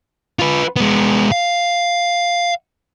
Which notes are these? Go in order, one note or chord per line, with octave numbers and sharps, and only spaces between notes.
F4 B4
G#3 B3
F5